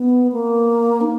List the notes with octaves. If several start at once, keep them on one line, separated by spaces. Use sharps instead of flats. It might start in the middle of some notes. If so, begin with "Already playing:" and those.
Already playing: B3
A#3
D#4